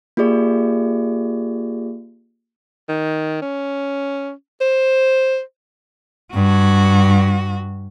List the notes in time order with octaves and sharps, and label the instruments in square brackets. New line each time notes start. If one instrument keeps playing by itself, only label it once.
[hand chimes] A#3 F4 G4 G#4 D5
[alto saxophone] D#3
C#4
C5
[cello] G2 F#4